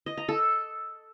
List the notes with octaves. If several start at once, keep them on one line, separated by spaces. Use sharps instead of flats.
D#5
A#5
A4